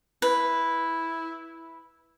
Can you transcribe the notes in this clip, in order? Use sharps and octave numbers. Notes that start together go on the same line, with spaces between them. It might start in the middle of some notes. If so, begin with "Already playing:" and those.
E4 B4